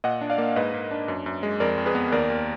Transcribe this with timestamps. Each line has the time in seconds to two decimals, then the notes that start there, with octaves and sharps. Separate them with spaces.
0.04 A#2 D#5 F#5
0.21 D4
0.30 D5 F5
0.38 A#3
0.56 G#2 B4 D#5
0.73 G#2
0.91 D4
1.08 F#2
1.26 F#2
1.43 G#3
1.60 F2 A#4 D5
1.78 F2
1.86 G#4 B4
1.95 B3
2.12 D#2 A#4 D5
2.30 D#2